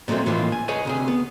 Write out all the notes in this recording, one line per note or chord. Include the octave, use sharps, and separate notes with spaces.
A#2 F#3 G#3 A3 C4
A2 E3 F3 G#3 A#3 F4
G#5
G#4 B4 C#5 D#5 G#5
D2 C3 G#4
B3